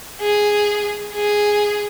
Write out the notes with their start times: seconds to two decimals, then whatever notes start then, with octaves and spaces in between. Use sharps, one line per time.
0.21 G#4
1.14 G#4